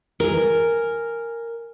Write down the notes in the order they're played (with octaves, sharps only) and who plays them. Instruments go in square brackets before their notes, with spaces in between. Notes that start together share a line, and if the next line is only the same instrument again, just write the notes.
[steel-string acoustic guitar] A#4 G#5